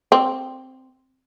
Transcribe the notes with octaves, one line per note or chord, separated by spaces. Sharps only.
C4